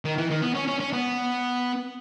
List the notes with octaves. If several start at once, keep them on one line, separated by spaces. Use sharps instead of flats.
D#3
E3
D#3
B3
C#4
C#4
C#4
B3